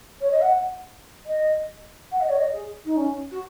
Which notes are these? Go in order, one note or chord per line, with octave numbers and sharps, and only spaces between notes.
C#5
D#5
F#5
D#5
F#5
D#5
C#5
D#5
G#4
D#4
C#4
F#4